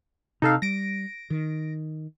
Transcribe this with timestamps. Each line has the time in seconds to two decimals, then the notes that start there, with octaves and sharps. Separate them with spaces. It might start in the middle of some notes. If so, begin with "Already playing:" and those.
0.42 C3 D#4 A4 F5
0.62 G3 A#6 D7
1.30 D#3